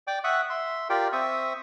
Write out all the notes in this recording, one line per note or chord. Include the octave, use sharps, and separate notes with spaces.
D5 G5 D6
E5 F#5 C#6 D#6 F#6
E5 C6
F4 G4 A#4 D5 F5 G5
C4 E5 C#6 D#6